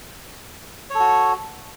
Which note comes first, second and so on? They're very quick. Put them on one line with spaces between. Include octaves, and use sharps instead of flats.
C#5 A4 F#4